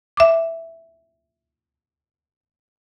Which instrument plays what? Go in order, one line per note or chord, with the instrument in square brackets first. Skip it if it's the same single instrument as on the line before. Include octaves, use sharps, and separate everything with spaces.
[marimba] E5 D6